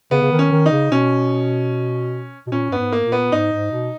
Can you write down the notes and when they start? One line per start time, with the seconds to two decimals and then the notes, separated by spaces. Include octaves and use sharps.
0.11 C#3 B3
0.22 C#3
0.32 D#3
0.39 C#4
0.52 D#3
0.66 D#4
0.72 C#3
0.92 B2 C#4
2.47 B2
2.52 A#2 C#4
2.70 G2 B3
2.79 G#2
2.92 A#3
3.05 A#2
3.12 B3
3.32 G#2 D#4
3.52 G#2
3.72 B2